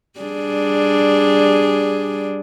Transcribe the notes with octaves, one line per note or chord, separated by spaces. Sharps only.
G3 D4 G#4